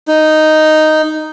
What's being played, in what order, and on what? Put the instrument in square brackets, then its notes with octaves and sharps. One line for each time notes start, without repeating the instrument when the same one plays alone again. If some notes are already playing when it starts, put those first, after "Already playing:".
[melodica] D#4